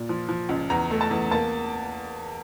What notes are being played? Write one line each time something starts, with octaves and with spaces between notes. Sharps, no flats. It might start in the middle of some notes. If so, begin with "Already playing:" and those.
Already playing: A#2
F3
F3
C#2
E2 A#5
A3
A5
E2
A#3 A5